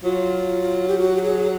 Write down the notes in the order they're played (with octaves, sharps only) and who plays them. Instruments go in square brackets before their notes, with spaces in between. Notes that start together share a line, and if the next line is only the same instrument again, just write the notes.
[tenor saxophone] F#3 [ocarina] F4
[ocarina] G4
F#4
G4
G#4